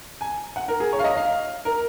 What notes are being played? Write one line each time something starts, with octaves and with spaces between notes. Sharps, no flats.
G#5
F#5
A#4
G#4
C#5
F5
D#5
F5
A#4